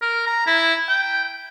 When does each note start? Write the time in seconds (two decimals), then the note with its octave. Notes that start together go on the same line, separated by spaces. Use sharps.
0.02 A#4
0.27 A#5
0.47 E4
0.89 G5